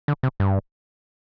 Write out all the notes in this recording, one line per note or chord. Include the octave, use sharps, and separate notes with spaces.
D3
C3
G2